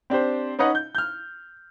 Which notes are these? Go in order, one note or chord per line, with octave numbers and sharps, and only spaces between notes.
C4 D4 G4 C5
C#4 D#4 B4 D#5 F#5
G6
F6 G6